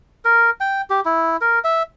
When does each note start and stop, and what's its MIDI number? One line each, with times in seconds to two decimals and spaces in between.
0.25 0.50 70
0.60 0.82 79
0.90 1.00 67
1.05 1.37 64
1.41 1.59 70
1.64 1.83 76